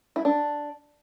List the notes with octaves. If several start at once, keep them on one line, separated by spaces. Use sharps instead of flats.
E4
D4